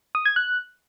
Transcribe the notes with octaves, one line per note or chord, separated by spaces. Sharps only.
D#6
G#6
F#6